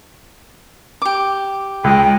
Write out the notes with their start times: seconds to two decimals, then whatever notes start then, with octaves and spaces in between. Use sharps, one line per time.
1.02 G4 D6
1.84 C#2 G#3 G5